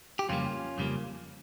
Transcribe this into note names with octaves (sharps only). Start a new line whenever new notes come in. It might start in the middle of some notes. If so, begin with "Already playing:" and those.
G4
F2 C#3 G3 A#3 C#4 F4
F2 C#3 G3 A#3